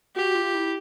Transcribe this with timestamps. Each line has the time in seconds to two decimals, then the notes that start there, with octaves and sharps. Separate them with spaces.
0.16 F#4 G4
0.35 F4
0.55 E4